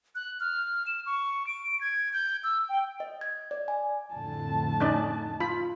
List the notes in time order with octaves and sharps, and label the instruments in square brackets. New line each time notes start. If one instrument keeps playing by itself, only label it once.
[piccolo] F#6
F6
E7
C#6
D7
G#6
G6
E6
G5
[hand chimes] D#5
G#6
D5
G#5
[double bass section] F2 A2 D3 [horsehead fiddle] A5
[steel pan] C#4 D#4 D5
F4 B5